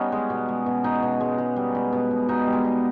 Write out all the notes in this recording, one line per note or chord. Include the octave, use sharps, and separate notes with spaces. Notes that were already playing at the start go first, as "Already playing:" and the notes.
Already playing: G3 B3 C#4 D#4
G#3
B2
G#3
B2
B2 D#4
B2
G#3
G#3
G3
G3
B2
B2
B2 D#4
G3
G#3
B2